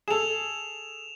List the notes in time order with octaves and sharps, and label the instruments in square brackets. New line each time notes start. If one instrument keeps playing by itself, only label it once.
[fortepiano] G#4 A4 [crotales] E7 F7